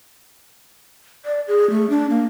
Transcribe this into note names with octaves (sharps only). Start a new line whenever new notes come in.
D5
G#4
A3
D4
A#3